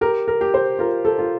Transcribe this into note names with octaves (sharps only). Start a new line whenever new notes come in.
G4 A#4
A#4
G4
C5
F4 A#4
A4
F4